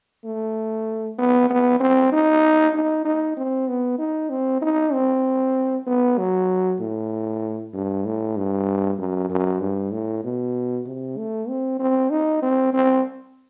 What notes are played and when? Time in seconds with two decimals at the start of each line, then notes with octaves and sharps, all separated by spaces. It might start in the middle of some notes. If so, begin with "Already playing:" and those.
0.25 A3
1.19 B3
1.50 B3
1.80 C4
2.13 D#4
2.74 D#4
3.05 D#4
3.37 C4
3.68 B3
3.99 D#4
4.30 C4
4.62 D#4
4.93 C4
5.87 B3
6.18 F#3
6.80 A2
7.74 G2
8.05 A2
8.37 G2
8.99 F#2
9.30 F#2
9.61 G2
9.92 A2
10.24 B2
10.86 C3
11.18 A3
11.49 C4
11.80 C4
12.11 D#4
12.42 C4
12.73 C4